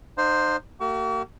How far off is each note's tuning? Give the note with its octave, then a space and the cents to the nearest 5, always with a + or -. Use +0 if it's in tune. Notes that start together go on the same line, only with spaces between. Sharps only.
D#4 -35 C5 +0 F5 +20
A#3 -35 F#4 +45 C#6 +45